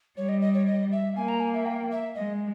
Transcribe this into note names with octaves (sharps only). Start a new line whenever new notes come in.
G3 C#5
D#5
D#5
C#5
D#5
E5
A#3 G#5
A#5
G#5
E5
G5
E5
G#3 D#5